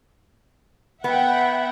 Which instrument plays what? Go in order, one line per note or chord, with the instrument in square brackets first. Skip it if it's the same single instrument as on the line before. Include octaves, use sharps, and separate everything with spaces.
[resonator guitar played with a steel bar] B3 [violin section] E5 F#5 G5